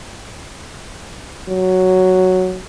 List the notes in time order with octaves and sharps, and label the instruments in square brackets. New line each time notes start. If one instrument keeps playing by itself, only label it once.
[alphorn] F#3